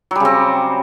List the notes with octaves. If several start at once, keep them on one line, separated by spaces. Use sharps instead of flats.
C#3 F#3 G3 C4